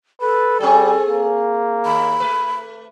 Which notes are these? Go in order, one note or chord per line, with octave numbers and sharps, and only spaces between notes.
A4 B4
G3 C4 G#4
A#3
D#2 B5
A3 B4